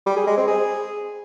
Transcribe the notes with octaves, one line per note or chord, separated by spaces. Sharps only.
G3
G#4
G#3
C4
G#4